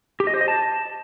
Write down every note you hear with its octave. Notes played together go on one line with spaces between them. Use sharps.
G4
D#5
C5
D#5
A5